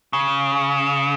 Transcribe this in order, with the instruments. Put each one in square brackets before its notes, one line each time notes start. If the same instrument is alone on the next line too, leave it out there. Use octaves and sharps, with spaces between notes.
[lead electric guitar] C#3